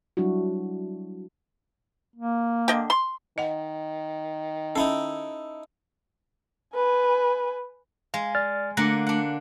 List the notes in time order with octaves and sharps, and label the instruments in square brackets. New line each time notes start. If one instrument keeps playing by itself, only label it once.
[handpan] F#3 G3 D4 E4 F#4
[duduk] A#3
[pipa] D3 D#5 G5
C6
[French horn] D#3 [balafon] D#5 F#5
[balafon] C#4 [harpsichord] D#4 E4 A4
[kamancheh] B4 G#5
[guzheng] G#3 [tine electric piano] F5
[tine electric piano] D5 F6 A6
[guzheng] D3 A#3 F#5 [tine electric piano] A3 A#6
[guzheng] D4 F#5